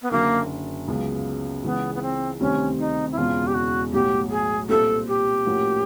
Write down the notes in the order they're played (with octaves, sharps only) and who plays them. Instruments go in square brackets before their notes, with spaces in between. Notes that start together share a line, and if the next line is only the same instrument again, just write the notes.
[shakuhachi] B3
[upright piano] F#1 F#2 D3 [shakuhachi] A#3
[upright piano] C#2 C#3 F#3 B3
[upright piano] C#2 C#3 E3 [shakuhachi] B3
[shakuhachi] B3
C4
[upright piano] D2 C3 D#3 G3 C4 [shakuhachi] C#4
[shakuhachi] D#4
E4
[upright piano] E1 E2 C#3 E3 [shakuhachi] F4
[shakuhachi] G4
F#4
[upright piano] B1 A2 F#3 [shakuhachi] G4
[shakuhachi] G#4
[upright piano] C2 A#2 G3 C4 F4 [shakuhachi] A4
[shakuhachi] G4
[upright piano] A2 F3 A#3 C#4 F#4